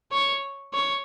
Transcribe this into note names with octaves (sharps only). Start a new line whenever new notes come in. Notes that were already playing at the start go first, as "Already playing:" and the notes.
C#5
C#5